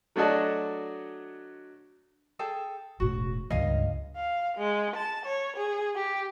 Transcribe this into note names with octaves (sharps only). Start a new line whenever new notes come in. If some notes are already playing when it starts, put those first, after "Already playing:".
F#3 A3 D4 F#4 D#5 A5
G#4 A4 G5
E1 A2 F#4
C#2 G2 D#5 F5
F5
G#3
A5
C#5
G#4
G4